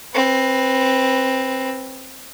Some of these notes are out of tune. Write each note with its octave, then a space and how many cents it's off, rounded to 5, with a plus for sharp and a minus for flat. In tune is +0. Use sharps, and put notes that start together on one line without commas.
C4 +15 B4 +0